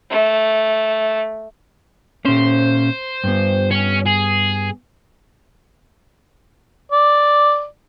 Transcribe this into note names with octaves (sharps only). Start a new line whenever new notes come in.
A3
A#2 C#4 C5
G2 B3
C#4
G#4
D5